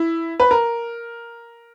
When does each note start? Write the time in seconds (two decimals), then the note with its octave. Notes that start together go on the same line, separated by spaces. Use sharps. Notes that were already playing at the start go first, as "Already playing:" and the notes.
Already playing: E4
0.40 B4
0.51 A#4